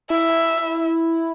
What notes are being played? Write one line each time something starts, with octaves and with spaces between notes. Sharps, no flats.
E4 E5